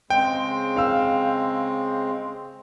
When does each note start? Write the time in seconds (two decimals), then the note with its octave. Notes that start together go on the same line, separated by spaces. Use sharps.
0.10 C#3 G#3 C4 G5
0.76 F5 E6